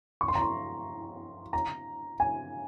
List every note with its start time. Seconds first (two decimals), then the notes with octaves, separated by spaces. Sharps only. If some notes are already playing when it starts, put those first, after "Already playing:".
0.21 C#6
0.28 C6
0.35 A#5
0.42 C6
1.53 A#5
2.20 G#5